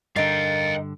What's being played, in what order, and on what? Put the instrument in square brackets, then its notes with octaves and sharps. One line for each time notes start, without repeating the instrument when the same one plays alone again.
[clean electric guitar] G2 D3 [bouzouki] D#4 A#4 [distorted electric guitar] F5 G5 [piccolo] A6